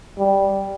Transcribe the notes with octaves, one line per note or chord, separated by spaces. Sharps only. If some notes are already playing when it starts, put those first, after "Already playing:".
G3